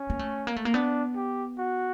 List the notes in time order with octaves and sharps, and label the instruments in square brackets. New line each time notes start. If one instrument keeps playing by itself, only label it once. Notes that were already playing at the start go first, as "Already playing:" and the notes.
Already playing: [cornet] C#4
[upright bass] A#3
A3
A#3
A3
A#3
[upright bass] B3 [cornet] D4
[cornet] G4
F#4